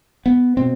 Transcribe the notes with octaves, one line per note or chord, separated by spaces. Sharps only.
B3
B2 C4